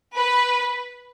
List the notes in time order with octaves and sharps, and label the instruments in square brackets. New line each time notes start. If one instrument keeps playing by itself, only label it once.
[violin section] B4